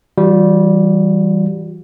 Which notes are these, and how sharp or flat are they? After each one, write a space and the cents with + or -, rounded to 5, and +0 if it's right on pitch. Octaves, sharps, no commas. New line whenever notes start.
E3 +0 G3 -10 F4 +45